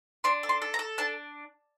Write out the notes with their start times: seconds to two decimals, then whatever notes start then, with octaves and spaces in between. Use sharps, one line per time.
0.24 D4 C6
0.43 A4
0.49 C6
0.62 A4
0.74 A#5
0.79 A4
0.98 D4 A5